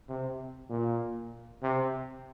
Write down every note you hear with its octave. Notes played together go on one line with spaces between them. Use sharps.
C3
A#2
C3